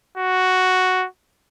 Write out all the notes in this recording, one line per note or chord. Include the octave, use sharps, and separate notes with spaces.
F#4